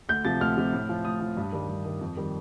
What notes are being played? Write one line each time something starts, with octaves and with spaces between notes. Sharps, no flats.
D2 G6
C3 F3 A6
D2 F6
C3 F3
A2
F3
A2 D#6
F3
G2
D#3 G3
G2
D#3 G3
F2
D#3 G3